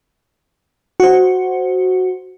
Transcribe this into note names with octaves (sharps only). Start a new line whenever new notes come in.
F#4 C5